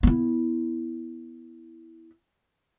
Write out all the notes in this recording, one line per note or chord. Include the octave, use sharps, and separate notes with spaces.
B3 E4